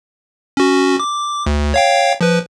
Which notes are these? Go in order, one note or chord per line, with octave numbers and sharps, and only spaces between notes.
C#4 F#4
D6
D2
C#5 F5 G5
F3 B4